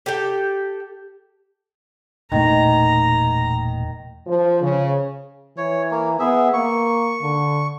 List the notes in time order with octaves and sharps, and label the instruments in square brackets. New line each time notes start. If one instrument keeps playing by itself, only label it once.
[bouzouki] G4 A4 G5
[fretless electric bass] E1 A#2 A3 [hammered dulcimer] D#3 [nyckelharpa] A#5
[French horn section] F3
C#3
[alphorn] E3 [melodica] C#5
[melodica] A#3
[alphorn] B3 [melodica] G#4 E5
[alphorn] A#3 [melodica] C#6
[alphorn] D3